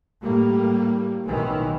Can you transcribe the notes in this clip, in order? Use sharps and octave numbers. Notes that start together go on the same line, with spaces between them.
A2 G3 A#3
B1 D#3 E3